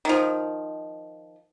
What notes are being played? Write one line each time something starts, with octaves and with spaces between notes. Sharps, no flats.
D#3 F3